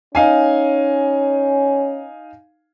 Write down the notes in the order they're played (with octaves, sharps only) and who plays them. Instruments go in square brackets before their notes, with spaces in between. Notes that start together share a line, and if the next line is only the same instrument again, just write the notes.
[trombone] C#4 [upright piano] D#4 F5 G#5